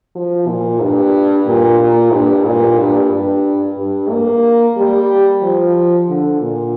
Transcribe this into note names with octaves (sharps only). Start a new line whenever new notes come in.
F3
A#2
G2
A#2
A#2
G2
A#2
G2
G2
G2
A#3
G3
F3
D3
A#2